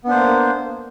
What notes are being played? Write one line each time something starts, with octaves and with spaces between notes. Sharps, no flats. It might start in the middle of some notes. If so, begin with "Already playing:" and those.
A#3 B3 D4 C5